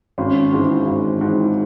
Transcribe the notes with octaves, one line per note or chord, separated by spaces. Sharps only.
G#1 C#4
G#2 E3
G#1
G#2 E3